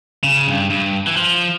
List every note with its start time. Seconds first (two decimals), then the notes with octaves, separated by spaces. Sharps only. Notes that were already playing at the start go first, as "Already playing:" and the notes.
0.24 C#3
0.47 G2
0.70 G2
1.07 E3
1.17 F3